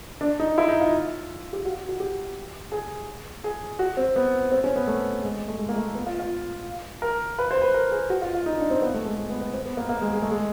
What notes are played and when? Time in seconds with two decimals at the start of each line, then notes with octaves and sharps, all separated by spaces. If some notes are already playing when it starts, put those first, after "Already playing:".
0.21 D4
0.40 D#4
0.58 E4
0.68 D#4
0.81 F4
1.53 G4
1.65 F#4
1.89 F#4
2.00 G4
2.72 G#4
3.44 G#4
3.79 F#4
3.97 C4
4.16 B3
4.52 C4
4.64 C#4
4.76 B3
4.87 A3
5.23 G#3
5.48 A3
5.58 G#3
5.69 A#3
5.76 A3
5.95 B3
6.06 F4
6.19 F4
7.02 A#4
7.39 B4
7.51 C5
7.62 B4
7.74 A#4
7.92 G#4
8.10 F#4
8.22 F4
8.34 F4
8.46 D#4
8.57 D4
8.70 C4
8.82 B3
8.94 A3
9.05 G#3
9.17 A3
9.30 B3
9.41 B3
9.53 C4
9.66 B3
9.77 A#3
9.89 A#3
10.02 G#3
10.13 G#3
10.22 A3
10.31 G#3